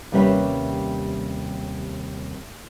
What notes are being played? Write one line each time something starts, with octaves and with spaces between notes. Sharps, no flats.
D#2 C3 G3 C#4 B4 E5